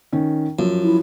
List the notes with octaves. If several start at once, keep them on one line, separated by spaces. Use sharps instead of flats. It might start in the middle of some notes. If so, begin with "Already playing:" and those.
D#3 C#4
F#2 F3
E4